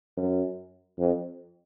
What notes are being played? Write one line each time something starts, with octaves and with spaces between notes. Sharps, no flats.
F#2
F2